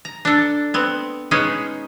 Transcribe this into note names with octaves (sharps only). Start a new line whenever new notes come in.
A#5
D4 A4
B3 C4
G#3 B3 C#4 D#4 G#4